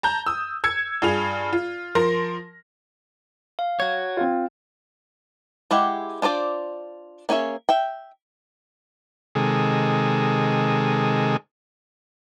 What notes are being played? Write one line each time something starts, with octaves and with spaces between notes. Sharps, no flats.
A5 A#5 G6
D#6 E6
E6 G#6 C#7
G2 F4 G#4 F7
F4
F3 A#4 C6 A#6
F5
F#4 C#5 G#6
C4 F4
G#3 E4 G4 F#5
D4 F4 C5 D5
A#3 C#4 G#4 C#5 E5
E5 G5
C3 D#3 G#3 G#4 A4